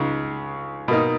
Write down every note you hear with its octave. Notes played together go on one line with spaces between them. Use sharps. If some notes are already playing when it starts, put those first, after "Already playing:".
Already playing: C#2 C#3 G#3 D#4
B2 A#3 D#4